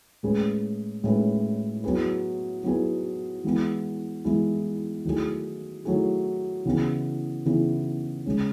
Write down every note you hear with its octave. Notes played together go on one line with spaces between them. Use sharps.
A2 G#3 C#4 G#4 B4
A2 G#3 C#4 G#4 B4
F#3 B3 E4 G#4 B4
F#3 B3 E4 G#4 B4
E3 G#3 B3 E4 G#4
E3 G#3 B3 E4 G#4
D#3 F#3 A3 E4 G#4
D#3 F#3 A3 E4 G#4
C#3 E3 B3 E4 G#4
C#3 E3 B3 E4 G#4
C#3 G#3 C#4